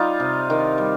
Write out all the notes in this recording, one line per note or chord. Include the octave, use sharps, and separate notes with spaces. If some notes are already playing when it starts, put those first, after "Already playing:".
Already playing: G3 D#4 F4
C3
D#3
G3